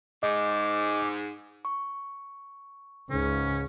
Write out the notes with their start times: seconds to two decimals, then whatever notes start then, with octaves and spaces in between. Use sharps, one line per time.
0.23 G#2 D#5 D6
1.65 C#6
3.10 C#2 G#2 C#3 C#4